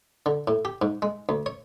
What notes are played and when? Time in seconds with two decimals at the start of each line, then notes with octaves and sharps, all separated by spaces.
0.26 D3
0.47 A2
0.65 G4
0.82 G#2
1.02 G#3
1.29 D2
1.46 C#5